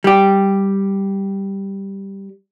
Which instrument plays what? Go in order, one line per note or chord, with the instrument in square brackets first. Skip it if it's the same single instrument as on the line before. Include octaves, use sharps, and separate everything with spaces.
[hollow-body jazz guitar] G3 G4